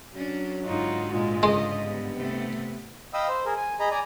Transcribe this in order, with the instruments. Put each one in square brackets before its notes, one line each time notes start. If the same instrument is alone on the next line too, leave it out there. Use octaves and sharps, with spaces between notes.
[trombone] F#3 [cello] C#4 D4
[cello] G#2 D3 [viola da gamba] D#4 F4 F#4
[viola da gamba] A#2 G#3 [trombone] F4
[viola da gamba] C#3 D#5 [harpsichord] G#3
[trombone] G2 [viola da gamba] B3
[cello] C3 A3
[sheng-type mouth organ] D#5 F5 G5 B5 D#6 E6
C5
G#4 A#4
G#5
G#4 D#5 A#5 B5
D5 G#5 A#5